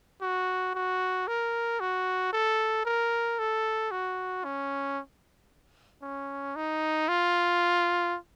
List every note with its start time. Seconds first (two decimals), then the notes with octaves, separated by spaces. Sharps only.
0.22 F#4
0.75 F#4
1.28 A#4
1.80 F#4
2.33 A4
2.85 A#4
3.39 A4
3.91 F#4
4.44 C#4
6.02 C#4
6.56 D#4
7.08 F4